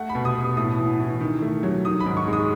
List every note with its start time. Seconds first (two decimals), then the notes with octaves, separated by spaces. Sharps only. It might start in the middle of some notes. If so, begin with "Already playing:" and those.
Already playing: A3 F#5
0.09 B5
0.15 B2
0.25 D#6
0.36 B2 D#6
0.57 A2 D#6
0.78 E3
1.00 E3
1.21 D#3
1.42 A3
1.63 F#3
1.85 D#3 D#6
2.00 B5
2.06 G#2
2.17 C#6
2.28 G#3
2.33 D#6